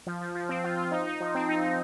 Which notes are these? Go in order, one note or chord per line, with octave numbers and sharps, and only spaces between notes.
F3
F3
F3
C4
F4
F4
D#4
D#4
F3
C4
D#4
D#4